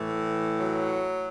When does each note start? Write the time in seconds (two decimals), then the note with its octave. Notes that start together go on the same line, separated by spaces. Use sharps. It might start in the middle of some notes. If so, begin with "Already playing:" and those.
Already playing: A2 E3
0.58 F#3